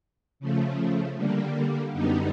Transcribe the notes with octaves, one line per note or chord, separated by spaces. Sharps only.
C#3 F3 A3
D3 G3 A#3
F#2 D3 G3 B3 D#4